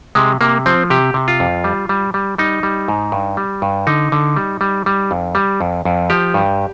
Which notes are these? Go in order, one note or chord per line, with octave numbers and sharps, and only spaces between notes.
C3 G#3
C3 A#3
F3 C4
C3 G4
C3
F4
F2
G3
G3
G3
G3 D#4
G3
G#2
G2
G3
G2
D3 D#4
D3
G3
G3
G3
F2
G3
F2
F2
F3 G4
G2